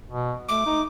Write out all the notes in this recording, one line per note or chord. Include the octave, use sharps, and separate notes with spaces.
B2
A3 D6
D#4